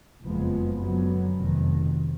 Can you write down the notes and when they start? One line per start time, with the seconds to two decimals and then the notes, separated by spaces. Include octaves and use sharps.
0.22 F#1 F2 F3 G#3 B3
0.80 F#2 D3 F#3 B3
1.39 F1 F2 D#3